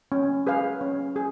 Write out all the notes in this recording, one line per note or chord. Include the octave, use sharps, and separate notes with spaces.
C#4
G#4 B4 F5
C#4
G#4